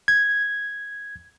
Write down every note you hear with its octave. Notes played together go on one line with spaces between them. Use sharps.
G#6